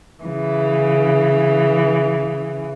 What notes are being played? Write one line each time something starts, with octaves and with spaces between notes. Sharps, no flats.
C#3 E3